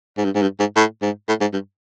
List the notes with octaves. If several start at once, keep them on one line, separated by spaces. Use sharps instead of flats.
G#2
G2
G#2
G2
G#2
A2
G#2
A2
G#2
G2